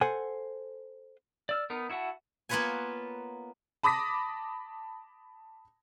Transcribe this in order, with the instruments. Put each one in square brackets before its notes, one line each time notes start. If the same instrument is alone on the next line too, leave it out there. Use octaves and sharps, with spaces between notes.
[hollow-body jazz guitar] A4 C5 F#5 G#5
[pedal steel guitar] D5 E6 F6
B3 D#4 A#4
E4 F#4 E5 F#5 A5
[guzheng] A#3 B3 F4 B4 C#5 G#5
[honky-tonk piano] A5 B5 D6 D#6 A#6 B6